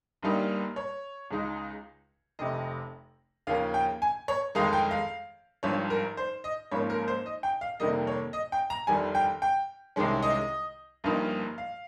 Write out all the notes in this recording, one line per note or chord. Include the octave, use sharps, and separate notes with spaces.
G1 G2 G3 A#3 D#4
C#5
C#2 C#3 G#3 D#4
F1 F2 C3 D#5
D#2 C#3 F3 A#3 C#4 F5
G5
G#5
C#5
G1 F2 D#3 G#3 D#4 F5
G5
F5
G#1 G2 F3 C#5
A#4
C5
D#5
G#1 G#2 F3 A#3 C#4 C#5
A#4
C5
D#5
G5
F5
F2 C3 D#3 G3 A#3 D#5
C#5
D#5
G5
A#5
G1 F2 D#3 G3 G#5
G5
G5
C2 C3 D#3 G#3 C#4
D#5
G1 G2 F3 A#3 D#4
F5